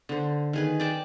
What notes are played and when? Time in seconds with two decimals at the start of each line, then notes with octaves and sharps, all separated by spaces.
0.09 D3 C5
0.53 D#3 G#4 B4
0.80 D5 G5 A5